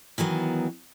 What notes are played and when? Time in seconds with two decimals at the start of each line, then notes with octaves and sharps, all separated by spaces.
0.18 D#3 E3 F#3 B3